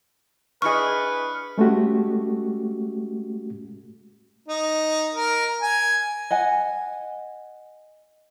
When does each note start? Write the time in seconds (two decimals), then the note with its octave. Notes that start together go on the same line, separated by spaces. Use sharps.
0.62 D4 E4 G#4 B4 D#5 C#6 F6 C#7
1.58 G#3 A3 C#4 F#4 G4
4.48 D#4
5.14 A#4
5.62 G#5
6.31 D#5 F#5 G#5